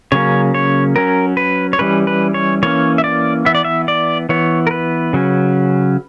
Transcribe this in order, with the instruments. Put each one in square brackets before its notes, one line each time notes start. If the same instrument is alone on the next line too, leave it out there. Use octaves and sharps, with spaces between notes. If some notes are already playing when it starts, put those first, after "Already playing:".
[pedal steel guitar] C#3 F#3 A#3 C#4 C#5
C#5
F#3 C#4 A#4
B4
C#5
E3 G3 C#4 B4
B4
C#5
E3 A#3 C#4 C#5
E5
D5
E3 B3 E5
D5
E5
D5
E3 B3 C#5
A#4
B4
C#3 F#3 C#4